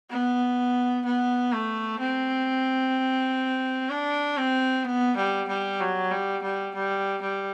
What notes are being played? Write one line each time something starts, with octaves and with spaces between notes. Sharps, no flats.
B3
B3
A3
C4
D4
C4
B3
G3
G3
F#3
G3
G3
G3
G3